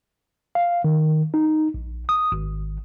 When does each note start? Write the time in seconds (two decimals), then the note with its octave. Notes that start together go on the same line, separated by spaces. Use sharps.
0.55 F5
0.84 D#3
1.34 D#4
1.74 A#1
2.09 D#6
2.32 G#1